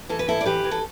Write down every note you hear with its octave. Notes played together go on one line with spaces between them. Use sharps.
E3 A4
B4
A2 E4 A4
D5
E3 G4 B4
E3
A4